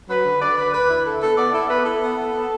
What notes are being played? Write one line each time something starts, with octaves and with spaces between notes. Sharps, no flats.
F#3 B4
D3
D3 D5
D4 B4
D2 B4
E4
D3 A4
B3 A4
B3 D5
E4 A4
B3 B4
E4 A4
B3
B3
B3